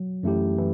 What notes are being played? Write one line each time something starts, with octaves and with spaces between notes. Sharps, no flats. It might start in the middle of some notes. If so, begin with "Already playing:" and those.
Already playing: F#3
F#2 E3 A3 E4 G4
E3 E4